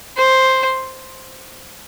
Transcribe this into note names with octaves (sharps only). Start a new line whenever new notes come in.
C5